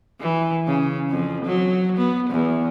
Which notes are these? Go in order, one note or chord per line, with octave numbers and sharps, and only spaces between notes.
E3
C#3
F2
F#3
B3
E2